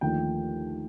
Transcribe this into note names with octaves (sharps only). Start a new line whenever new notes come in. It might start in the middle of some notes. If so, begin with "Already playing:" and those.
D#2 D3 F3 A3 G5